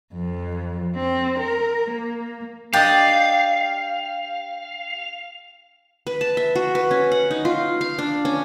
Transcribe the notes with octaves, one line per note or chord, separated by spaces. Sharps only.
F2
C4
A#4
A#3
D4 G4 D5 D#5 F5
B4
A5
E5
F#4
B4
C#4
F#5
D#4
F4
F5
D4
C#4